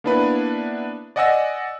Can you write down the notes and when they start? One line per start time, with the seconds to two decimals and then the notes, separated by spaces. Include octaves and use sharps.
0.04 A#3 B3 D4 E4 B4
1.16 D5 D#5 F#5 G#5 E6 A#6